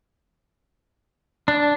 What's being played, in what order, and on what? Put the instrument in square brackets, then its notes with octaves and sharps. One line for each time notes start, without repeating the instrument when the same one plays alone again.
[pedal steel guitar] D4